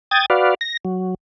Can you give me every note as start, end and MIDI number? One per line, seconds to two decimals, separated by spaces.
0.11 0.26 79
0.11 0.26 87
0.11 0.26 92
0.11 0.26 93
0.30 0.54 66
0.30 0.54 71
0.30 0.54 74
0.30 0.54 77
0.61 0.77 94
0.85 1.15 54